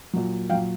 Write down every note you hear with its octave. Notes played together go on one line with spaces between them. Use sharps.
A#2 F#3
A#2 F#3 F5 G5